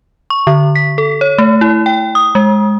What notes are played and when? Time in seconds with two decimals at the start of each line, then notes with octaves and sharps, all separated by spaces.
0.30 C#6
0.47 D3
0.75 B6
0.98 A4
1.21 C#5
1.38 A3
1.61 E4
1.86 G5
2.15 D#6
2.35 G#3